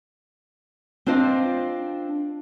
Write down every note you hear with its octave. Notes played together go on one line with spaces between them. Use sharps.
C4 D4 F4 C5 D#5